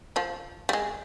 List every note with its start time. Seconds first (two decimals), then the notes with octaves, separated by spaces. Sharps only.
0.16 F3 F4
0.69 G3
0.73 G#3